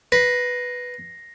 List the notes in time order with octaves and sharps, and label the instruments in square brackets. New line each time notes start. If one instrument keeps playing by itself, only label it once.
[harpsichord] B4 [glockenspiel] A#6 C7